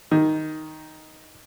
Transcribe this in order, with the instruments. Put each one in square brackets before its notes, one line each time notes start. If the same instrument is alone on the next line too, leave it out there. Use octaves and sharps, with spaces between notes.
[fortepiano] D#3